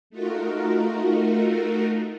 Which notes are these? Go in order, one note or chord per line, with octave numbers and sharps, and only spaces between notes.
A3 D#4 F4 F#4 A#4